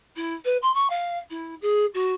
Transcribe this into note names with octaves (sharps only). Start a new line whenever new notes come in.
E4
B4
C6
C#6
F5
E4
G#4
F#4